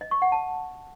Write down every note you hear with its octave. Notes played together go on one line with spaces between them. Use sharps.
D#5
C#6
F#5
A5